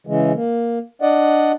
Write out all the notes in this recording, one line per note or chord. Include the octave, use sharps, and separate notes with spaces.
C#3 E3 G#3
A#3
D4 D5 D#5 F#5